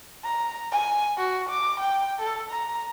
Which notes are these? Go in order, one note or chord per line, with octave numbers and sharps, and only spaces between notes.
A#5
G#5
F#4
D6
G5
A4
A#5